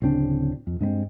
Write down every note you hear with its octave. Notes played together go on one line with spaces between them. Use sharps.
D1 C#3 C4 D4
F2
G2 G#3 B3 C4